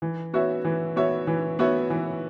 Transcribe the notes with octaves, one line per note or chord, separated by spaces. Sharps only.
E3
B3 F#4 C#5 E5
E3
B3 F#4 C#5 E5
E3
B3 F#4 C#5 E5
E3